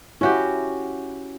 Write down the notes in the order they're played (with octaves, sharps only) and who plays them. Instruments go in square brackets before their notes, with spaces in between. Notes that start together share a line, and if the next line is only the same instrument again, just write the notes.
[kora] C#4 F#4 G4 [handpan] E4